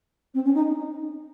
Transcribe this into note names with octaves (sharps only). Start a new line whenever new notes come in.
C4
C#4
D#4